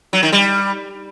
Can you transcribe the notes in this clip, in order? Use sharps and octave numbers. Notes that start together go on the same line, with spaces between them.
F#3
D#3
G3